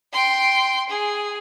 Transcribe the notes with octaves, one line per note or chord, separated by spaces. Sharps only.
G5 C6
G#4